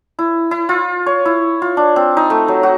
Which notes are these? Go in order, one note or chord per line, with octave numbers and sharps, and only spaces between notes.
E4
E4
F4
C#5
E4
F4
D4
C4
D#4
A3
F#3
F#4